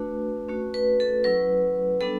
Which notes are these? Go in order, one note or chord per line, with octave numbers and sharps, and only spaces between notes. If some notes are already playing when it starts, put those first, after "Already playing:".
Already playing: A3 D4 F#4 B4
A3 C#4 F#4
B4
A4
F#3 C#4 E4 B4
G3 B3 D4 A4